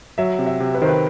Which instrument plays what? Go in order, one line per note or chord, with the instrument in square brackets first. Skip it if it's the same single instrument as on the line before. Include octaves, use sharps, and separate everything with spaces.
[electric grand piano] F#3 [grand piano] E5
[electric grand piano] C3
[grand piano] E5
[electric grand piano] C3
[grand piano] B4
[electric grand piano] D#3 [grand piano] C5
[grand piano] B4